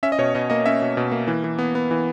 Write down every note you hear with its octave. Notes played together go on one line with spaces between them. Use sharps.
C#4 E5
D#5
B2 C#5
B2 D#5
A#3 D#5
C#4 E5
B2
B2
A#3
E3
E3
B3
B3
E3